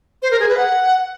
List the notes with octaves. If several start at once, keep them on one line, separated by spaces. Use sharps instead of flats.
C5
A#4
G#4
B4
F#5